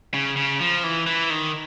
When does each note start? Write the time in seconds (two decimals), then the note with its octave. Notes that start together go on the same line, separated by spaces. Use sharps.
0.14 C#3
0.37 C#3
0.60 F3
0.84 E3
1.07 E3
1.30 D#3